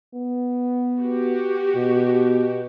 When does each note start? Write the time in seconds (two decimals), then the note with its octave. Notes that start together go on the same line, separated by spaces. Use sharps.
0.14 B3
0.99 F#4 G4
1.75 B2